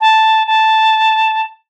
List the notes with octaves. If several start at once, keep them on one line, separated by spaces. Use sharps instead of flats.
A5
A5